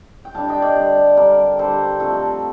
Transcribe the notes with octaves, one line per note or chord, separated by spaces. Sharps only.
G5
D3 G3 D4 F5 A5
D#5 G5
D5 F5
D3 G3 D4
D3 G3 D4 A#4 D5
D3 G3 D4 A4 C5
F3 A3 C4 F4 A4